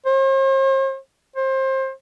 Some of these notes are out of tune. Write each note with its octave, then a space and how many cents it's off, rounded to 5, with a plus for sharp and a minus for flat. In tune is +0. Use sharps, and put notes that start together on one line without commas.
C5 +45
C5 +25